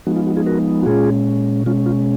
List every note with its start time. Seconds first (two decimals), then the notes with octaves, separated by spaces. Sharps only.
0.07 F3 G#3 B3 D#4 F#4
0.16 F4
0.27 F#4
0.36 F4 G#4
0.46 F#4 A#4
0.82 F#4
0.86 A#2 G#3 C#4 F4 G#4
1.66 B2 G#3 C#4 F4
1.86 F4